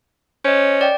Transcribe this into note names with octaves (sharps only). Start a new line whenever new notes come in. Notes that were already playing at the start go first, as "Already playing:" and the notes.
C#4 C5 D#5
D5 G5